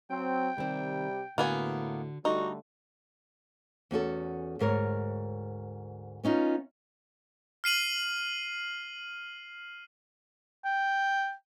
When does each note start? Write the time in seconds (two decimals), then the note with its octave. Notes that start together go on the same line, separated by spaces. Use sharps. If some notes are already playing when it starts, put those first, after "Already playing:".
0.10 F#3 C4 G5
0.58 C3 D#3 G3 C4
1.38 A2 D3 A#3 B3 F#4 G#5
2.25 D3 G3 A3 D#4 F#4
3.91 E2 C#4 F#4 A4
4.59 D2 G#2 A#4 C#5
6.24 B3 C#4 D#4 F4
7.64 F6 C7 D#7 F#7
10.64 G5